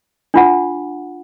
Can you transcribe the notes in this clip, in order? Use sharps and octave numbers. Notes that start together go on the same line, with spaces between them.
D4 F4 F#5